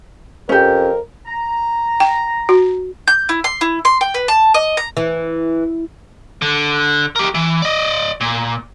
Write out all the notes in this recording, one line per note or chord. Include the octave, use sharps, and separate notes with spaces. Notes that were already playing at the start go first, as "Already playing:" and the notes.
F2 C#4 G4 A#4
A#5
G5
F#4
G6
E4
C6
E4
C6
G5
B4
A5
D#5
A#5
E3
D3
G4 A#4
E3
D5 D#5
A#2